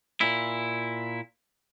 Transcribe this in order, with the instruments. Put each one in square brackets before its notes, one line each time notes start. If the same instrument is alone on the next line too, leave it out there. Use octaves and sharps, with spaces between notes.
[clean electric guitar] A#2 E4